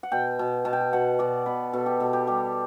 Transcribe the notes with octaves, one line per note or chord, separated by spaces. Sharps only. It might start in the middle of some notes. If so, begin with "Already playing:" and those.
F#5
B2 G5
B2
B2 A5
G5
A5
B2 F#5
B2 D5
B2 B4
B2 A4
G4
B2 A4
G4
G3 G4